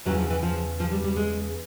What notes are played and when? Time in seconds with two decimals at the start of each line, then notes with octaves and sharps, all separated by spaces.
0.05 E2 C#3 E3 F#3
0.18 F3
0.30 E3
0.43 F3
0.80 F3
0.92 G3
1.04 G3
1.16 G#3